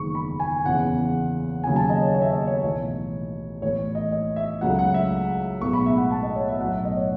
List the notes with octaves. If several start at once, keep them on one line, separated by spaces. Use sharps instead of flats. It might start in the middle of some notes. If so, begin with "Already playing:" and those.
Already playing: F#1 E2 D#3 G#3 B3 C#6
B5
G#5
E2 C#3 E3 F#5
D#2 C#3 F#3 G#5
A5
D#5
C#5
C#5
E5
D#5
C#5
B1 A2 E3 C#5
A1 A2 E3 C#5
D#5
D#5
E5
C#2 C#3 F#3 A3 F#5
F#5
E5
B1 A2 G#3 B3 C#6
B5
E5
F#5
A5
D#5
C#5
E5
B1 A2 F#3 F#5
E5
D#5
C#5